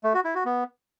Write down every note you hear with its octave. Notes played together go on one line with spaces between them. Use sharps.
A3
F#4
E4
F#4
B3